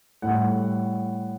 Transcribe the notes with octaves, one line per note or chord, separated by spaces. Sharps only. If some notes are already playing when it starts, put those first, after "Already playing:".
A2 G3 F#5